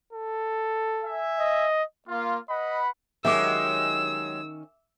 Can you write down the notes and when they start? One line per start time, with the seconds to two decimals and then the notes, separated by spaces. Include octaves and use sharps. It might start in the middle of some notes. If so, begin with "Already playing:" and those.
0.13 A4
1.03 E5 G#5
1.39 D#5
2.08 A#3 F4
2.49 B4 D#5 F#5 B5
3.25 D#3 F#3 G#3 C#4 G4 E5 D6 E6